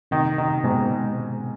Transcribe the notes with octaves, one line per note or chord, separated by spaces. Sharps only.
C3 D#3
D#3
G#2 B2